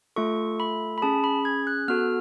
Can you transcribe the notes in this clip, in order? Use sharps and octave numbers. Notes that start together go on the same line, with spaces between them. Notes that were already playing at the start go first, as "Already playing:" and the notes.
A3 F4 A4 C#6
B5
B5
C#4 G#4 A5
B5
G#6
F#6
B3 F#4 A4 F6